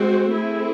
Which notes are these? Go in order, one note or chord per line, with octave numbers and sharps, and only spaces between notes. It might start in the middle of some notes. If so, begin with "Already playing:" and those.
Already playing: G#3 C4 F#4 C5
A3 C4 E4 G#4